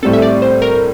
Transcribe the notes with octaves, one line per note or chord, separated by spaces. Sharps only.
A2 G3 C4 A4
E5
D5
C5
A#4